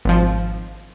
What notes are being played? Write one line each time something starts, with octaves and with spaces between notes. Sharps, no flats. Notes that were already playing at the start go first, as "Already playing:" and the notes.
G#1 F3